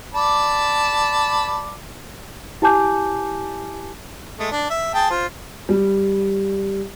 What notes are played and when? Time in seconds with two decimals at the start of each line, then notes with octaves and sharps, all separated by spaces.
0.14 D5 A5 B5
2.62 E4 G4 G#5 A5 D6 G6
4.39 G#3 A3
4.52 D4
4.70 E5
4.94 G#4 G5 A5
5.10 F4 C5
5.69 G3